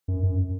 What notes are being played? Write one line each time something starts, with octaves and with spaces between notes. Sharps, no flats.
F#2
F#2